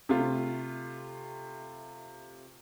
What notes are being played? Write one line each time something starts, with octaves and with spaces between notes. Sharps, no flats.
C3 A3 F4